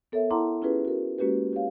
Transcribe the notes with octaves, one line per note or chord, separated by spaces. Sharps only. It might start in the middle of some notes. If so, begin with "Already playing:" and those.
B3 A4 A#4 C#5 E5
E4 F#5 A5 A#5 C6 D6
C#4 E4 F4 G4 G#4 B4
F#4 A#4
G#3 A#3 C#4 F#4 G4 B4
G4 C#5 F5